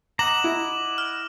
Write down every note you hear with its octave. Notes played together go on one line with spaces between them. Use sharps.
D#5 F#5 A#5 D6 E7 F#7
E4
F6